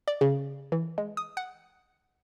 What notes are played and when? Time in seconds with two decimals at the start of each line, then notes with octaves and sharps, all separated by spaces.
0.08 D5
0.21 C#3
0.72 E3
0.98 G#3
1.17 D#6
1.37 F#5